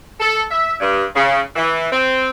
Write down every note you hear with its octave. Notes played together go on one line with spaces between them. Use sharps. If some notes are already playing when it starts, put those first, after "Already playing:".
A4
E5
G2
C#3
E3
C4